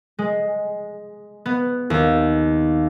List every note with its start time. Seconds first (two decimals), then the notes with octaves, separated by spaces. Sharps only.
0.19 G#3
1.46 B3
1.90 D#2